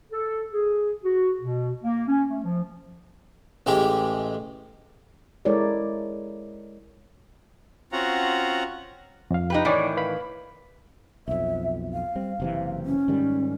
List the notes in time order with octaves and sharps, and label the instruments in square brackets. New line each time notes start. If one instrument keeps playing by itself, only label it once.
[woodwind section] A4
G#4
F#4
B2
A#3
C#4
A3
F3
[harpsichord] A1 G#3 G4
[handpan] G#3 E4 A4 A#4 C#5 D5
[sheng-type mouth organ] C4 C#4 F4 F#4 F#5 A#5
[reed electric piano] F2 F5
[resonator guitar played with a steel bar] D#4 G4 B4
[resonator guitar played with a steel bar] A2 D#3 E3 [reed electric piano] C#5 D5 B5
[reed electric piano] B4 F5 B5
[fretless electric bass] B1 F2 [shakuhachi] E5
[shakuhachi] F5
[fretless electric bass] G3 C4
F#1 C3 E3
[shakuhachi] C#4
[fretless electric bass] G#2 D#3 G3